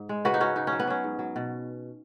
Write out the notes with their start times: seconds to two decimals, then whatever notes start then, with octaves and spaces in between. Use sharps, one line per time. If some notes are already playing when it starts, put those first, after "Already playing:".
Already playing: G#2
0.09 G#3
0.25 C#3 F#4 B4
0.34 D#4
0.40 C#3 C#4 F#4
0.56 C#3 D#4
0.67 C#4
0.72 F#3
0.79 B3
0.87 F#3 C#4
1.04 G#2
1.19 F#3
1.36 B2